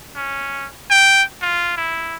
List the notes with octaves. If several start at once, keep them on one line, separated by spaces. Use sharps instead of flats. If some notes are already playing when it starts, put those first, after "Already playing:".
C#4
G5
F4
E4